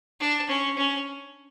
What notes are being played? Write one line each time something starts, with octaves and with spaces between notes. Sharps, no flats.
D4
C#4
C#4